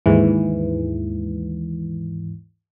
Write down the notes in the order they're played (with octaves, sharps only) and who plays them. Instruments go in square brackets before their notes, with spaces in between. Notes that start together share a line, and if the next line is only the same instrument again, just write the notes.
[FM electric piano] D#2 G#2 E3